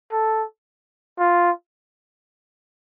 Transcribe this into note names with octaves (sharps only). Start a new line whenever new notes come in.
A4
F4